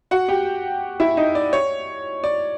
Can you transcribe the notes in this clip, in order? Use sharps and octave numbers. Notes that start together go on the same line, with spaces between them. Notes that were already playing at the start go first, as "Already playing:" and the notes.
F#4 F#5
G4 G5
E4 E5
D#4 D#5
D5
C#5
D5